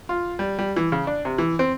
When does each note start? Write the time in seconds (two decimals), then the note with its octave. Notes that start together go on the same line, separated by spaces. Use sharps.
0.09 F4
0.39 G3
0.59 G3
0.76 E3
0.92 C#3
1.07 D4
1.25 C3
1.38 E3
1.59 C4